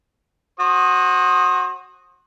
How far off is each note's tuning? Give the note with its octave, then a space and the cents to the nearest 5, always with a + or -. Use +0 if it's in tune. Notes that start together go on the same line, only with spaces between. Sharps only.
F#4 +0 C5 +30 D#6 +0